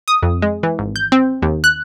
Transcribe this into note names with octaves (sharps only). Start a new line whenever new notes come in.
D#6
F2
G#3
E3
G#1
G6
C4
D#2
F#6